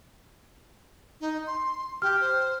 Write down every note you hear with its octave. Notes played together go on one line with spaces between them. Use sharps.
D#4
C6
G4 F6
C5